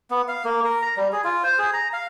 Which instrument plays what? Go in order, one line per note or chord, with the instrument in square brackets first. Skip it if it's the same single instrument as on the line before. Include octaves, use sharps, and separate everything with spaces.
[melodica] B3
F5
A#3
A#4
A#5
G3
G#4
F4
C5
G#4
A#5
F5